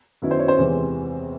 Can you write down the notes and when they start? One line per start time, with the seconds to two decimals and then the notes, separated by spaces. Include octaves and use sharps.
0.22 F#2 D#3 F#3 B3 E4
0.31 C5
0.39 C#5
0.48 C5
0.57 E2 C3 E3 G#3